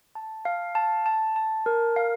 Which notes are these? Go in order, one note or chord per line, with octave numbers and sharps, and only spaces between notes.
A5
F5
A5
A5
A5
A#4
F5